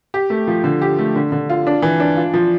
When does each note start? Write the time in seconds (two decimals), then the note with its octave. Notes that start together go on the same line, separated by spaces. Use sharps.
0.14 G4
0.30 A3
0.47 F3
0.64 D3
0.82 G4
0.99 A3
1.16 D3
1.32 D3
1.50 F4
1.67 D4
1.82 E3
2.00 D4
2.17 F4
2.34 F3